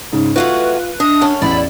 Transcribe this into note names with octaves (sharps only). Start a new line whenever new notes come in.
G#2 C#3
E3 A3 F4 F#4 B4
D4 D#5 D#6
F#2 C#4 A5
A1 E2 E4 D5 B5